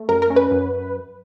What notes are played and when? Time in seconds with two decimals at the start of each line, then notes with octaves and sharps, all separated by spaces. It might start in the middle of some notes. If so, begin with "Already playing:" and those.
Already playing: A3
0.09 F#2 A#4
0.22 A#4
0.30 C#4
0.36 B4
0.51 F#2